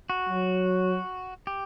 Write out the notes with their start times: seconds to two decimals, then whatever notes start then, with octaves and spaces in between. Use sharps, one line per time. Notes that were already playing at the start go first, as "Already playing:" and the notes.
0.10 F#4
0.29 F#3
1.47 G4